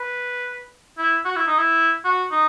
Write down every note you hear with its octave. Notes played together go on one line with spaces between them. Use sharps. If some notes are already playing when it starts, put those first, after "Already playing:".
Already playing: B4
E4
F#4
E4
D#4
E4
F#4
D#4